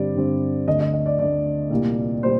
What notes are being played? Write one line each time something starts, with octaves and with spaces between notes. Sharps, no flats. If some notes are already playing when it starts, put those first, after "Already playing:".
Already playing: G2 D3 G3 C4 D5
G2 D3 G3 C4
D2 D3 A3 D#5
D#5
D#5
D5
D2 D3 A3 D5
C2 A#2 G3 A#3
A#2 G3 C5